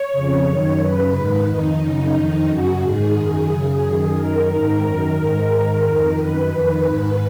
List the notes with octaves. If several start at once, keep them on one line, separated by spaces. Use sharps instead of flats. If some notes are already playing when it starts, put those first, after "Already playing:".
Already playing: C#5
F2 C#3
F#2 D#3
F#2 C#3 B4
G#2 D#3
F2 D#3 D#4
F#2 C#3 D#4
F2 D#3
F#2 C#3 F#4
G#2 D#3 G#4
F#2 D#3
F#2 C#3
F#2 D#3
F#2 D#3 A#4
G#2 D#3
F#2 D#3 A#4
G#2 D#3
G#2 D#3
F2 D#3
F#2 D#3 B4
F2 D#3
G#2 D#3 B4